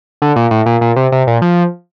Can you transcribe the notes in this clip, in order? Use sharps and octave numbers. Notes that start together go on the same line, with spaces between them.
D3
A#2
A2
A#2
A#2
C3
C3
A#2
F3